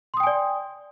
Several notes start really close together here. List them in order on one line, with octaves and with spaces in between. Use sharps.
C6 D#6 G5 G#5 D5